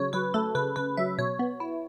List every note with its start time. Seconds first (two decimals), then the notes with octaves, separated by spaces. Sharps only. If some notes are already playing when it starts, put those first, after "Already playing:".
Already playing: C#3 F#3 C#5
0.13 F#3 B4
0.34 A3 A4
0.55 C#3 B4
0.76 C#3 B4
0.97 F#3 E5
1.18 B2 C#5
1.39 B3
1.60 E4